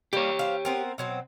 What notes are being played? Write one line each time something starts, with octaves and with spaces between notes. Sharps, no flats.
G3 A#3 G4 C#5
C5 F5
B3 C4 A#4
B2 F#3 C4